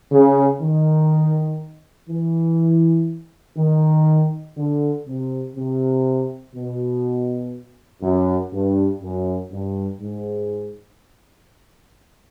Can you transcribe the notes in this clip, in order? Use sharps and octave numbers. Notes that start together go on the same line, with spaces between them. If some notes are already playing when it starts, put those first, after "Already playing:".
C#3
D#3
E3
D#3
D3
C3
C3
B2
F#2
G2
F#2
G2
G#2